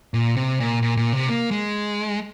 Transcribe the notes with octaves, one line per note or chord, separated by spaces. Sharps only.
A#2
C3
A#2
A#2
A#2
C3
A#3
G#3